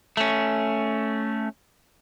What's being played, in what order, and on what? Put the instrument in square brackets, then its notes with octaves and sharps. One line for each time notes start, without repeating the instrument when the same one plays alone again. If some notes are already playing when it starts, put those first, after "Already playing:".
[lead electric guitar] A3 C#4